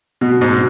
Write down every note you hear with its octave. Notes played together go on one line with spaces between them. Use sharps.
B2
G#2
B2